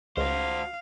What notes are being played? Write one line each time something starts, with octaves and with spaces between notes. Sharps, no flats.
C#2 F#4 C5 F5